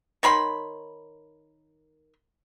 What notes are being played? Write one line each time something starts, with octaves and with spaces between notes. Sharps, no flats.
D#3 C#5 B5 C6